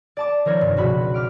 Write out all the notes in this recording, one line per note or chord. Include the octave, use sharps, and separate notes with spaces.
D5 A5 D6
D#3 F3 A#4 C5 C#5
F1 G2
C#2 B2 E4 F#4 B5
B4
D6 F6 D7